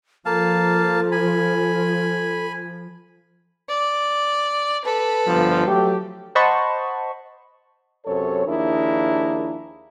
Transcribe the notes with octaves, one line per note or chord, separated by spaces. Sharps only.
F3 A#3 A4 F5 A5
G#5 B5
D5
A4 B4
G1 F3
F#3 A3 G4
C5 D#5 F#5 A5 B5 C#6
F#2 C3 A4 C5 C#5
D#2 F3 D4 E4 G#4 A#4